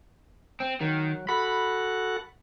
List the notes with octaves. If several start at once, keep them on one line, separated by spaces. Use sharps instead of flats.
C4
D#3 F#3
F#4 A4 F#5 B5